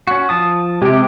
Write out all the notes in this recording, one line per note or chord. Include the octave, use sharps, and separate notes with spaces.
C#4 F#4
F3 A5 D#6
C3 G#3 G4